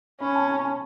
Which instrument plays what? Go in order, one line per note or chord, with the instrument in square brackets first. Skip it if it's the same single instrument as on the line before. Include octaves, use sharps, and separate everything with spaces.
[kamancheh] C#4 [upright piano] B5
[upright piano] A5
A5
A5